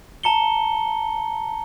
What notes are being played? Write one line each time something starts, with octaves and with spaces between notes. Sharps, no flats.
A5 A#5 C#7 G7